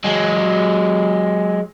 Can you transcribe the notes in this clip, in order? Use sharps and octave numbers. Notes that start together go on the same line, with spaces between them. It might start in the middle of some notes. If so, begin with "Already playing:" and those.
F#3 G#3